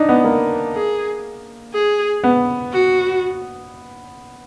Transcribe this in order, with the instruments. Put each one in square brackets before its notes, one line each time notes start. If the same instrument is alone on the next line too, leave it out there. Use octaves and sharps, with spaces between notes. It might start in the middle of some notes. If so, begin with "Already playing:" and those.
Already playing: [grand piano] D4 D#4
B3
A#3
[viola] G#4
G#4
[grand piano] B3
[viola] F#4